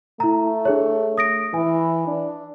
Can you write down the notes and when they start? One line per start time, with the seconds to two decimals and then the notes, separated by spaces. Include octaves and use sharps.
0.20 A3 E4 A#5
0.65 D4 G#4 C#5
1.18 D#6 A#6 D7
1.54 E3 G#5
2.08 D4